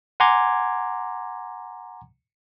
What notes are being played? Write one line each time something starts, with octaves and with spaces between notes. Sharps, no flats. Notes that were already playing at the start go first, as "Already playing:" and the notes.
F#5 G#5 A#5 C6 D6 G#6